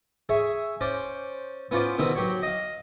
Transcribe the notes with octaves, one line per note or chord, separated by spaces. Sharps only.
G#4 C#5 E5
C#4 C5 D5
B3 C#4 F4 C5 D5
B2 D#3 B3 C4
F#3 G4 C#5
D#5 F5